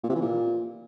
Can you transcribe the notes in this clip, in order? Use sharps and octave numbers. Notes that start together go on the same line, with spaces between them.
A#2
C3
E3
A#2